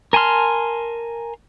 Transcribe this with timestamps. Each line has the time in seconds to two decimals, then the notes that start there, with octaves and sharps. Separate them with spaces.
0.13 A#4 G#5 A5 C6 F6